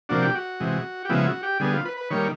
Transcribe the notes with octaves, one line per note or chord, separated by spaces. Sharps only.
C3 F3 A#3 D4 F#4
G4
F#4
C3 E3 G#3
G4
C#3 F3 G#3 B3 E4 F#4
F#4
G4
D3 G3 B3 G#4
F4
B4
B4
D#3 G3 A#3 C#5